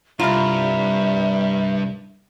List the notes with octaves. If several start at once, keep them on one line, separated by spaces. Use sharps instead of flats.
C2 G2 F4 E5 A#5 B5 F6